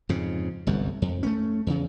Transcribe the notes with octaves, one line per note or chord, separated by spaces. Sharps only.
F2 G#2 C#3
G1 C2 F#2
F2
A3 A#3 C#4
E2 C#3